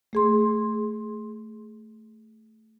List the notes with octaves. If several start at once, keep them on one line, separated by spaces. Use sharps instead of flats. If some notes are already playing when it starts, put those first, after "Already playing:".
A3 G#4 C6